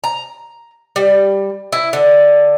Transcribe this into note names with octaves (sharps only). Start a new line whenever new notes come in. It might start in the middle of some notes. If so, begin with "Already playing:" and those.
A#5
G3
E4
D3